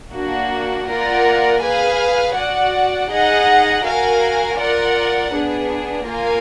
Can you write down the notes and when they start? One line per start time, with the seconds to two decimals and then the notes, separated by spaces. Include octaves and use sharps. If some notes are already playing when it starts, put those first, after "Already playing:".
0.13 A#3 D4 F#4
0.86 A#3 F4 A#4 D5 F#5
1.61 G#4 B4 F5 G#5
2.35 F#4 D5 F#5
3.09 D#4 G#4 D#5 F#5
3.84 F#4 A#4 F5 G#5
4.58 F4 A#4 D5 F#5
5.32 B3 D4 G#4
6.06 A#3 F4 A#4 F5 G#5